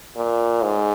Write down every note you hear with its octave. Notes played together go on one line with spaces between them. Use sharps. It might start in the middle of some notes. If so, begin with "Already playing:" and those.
A#2
G#2